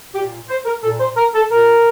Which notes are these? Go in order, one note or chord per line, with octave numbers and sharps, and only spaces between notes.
A#2 G4
C5
A#4
A#2 A4
C5
A#4
A4
A#2 A#4